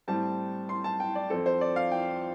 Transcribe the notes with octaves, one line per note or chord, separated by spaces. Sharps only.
A2 G3 C4 A5
C6
A5
G5
D5
F2 F3 C4 A4
C5
D5
F5
G5